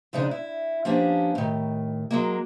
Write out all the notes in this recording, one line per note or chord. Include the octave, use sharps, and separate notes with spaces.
F2 C#3 G#3 D4 D#4
E4
F3 A#3 B3 C#4 D4 G4
A2 D#3
F#3 G#3 A#3